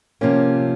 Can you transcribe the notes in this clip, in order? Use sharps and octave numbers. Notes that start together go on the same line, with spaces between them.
C3 F3 A#3 C#4